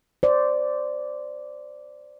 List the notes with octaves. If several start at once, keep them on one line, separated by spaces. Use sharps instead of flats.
C5 D5